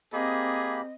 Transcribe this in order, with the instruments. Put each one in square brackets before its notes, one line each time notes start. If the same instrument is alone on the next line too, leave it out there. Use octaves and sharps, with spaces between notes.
[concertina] A#3 G4 B5 [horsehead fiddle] C4 [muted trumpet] G#4 [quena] D#5